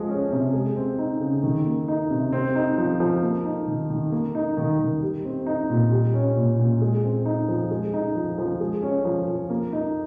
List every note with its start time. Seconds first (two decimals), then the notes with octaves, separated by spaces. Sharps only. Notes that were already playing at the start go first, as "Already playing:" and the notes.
Already playing: F3 G#3
0.09 C#4
0.32 C3
0.53 G#3
0.76 C4
0.99 D#4
1.20 C#3
1.43 D#3
1.66 A#3
1.88 D#4
2.10 C3
2.33 C4
2.55 D#4
2.78 F3
3.00 F3
3.22 A#3
3.45 D#4
3.67 D#3
3.90 D#3
4.12 A#3
4.35 D#4
4.57 D#3
4.79 D#3
5.02 G3
5.25 C4
5.46 D#4
5.70 A#2
5.91 G3
6.14 C#4
6.36 A#2
6.59 A#2
6.82 G#3
7.04 C4
7.26 D#4
7.49 F3
7.71 G#3
7.94 D#4
8.15 F3
8.38 F3
8.60 G#3
8.83 C#4
9.05 F3
9.28 F3
9.50 A#3
9.73 D#4